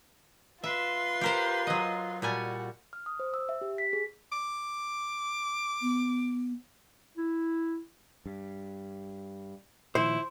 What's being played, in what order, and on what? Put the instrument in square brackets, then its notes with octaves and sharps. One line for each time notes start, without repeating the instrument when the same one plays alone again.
[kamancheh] F4 [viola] B4 C6 [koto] E5
[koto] G4 A#4 C5
F#3 D#5
[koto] A#2 G3 G#5 [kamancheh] F#4
[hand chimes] F6
D#6
C5
E6
E5
G4
B6
G#4
[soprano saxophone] D6
[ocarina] B3
[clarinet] E4
[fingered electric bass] G2
[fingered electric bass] A#2 D#3 F3 [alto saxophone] E4 [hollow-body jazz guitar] C5